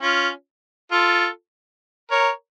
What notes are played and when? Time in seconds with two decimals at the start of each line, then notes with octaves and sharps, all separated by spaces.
0.02 C#4 F4
0.92 F4 A4
2.11 A#4 C#5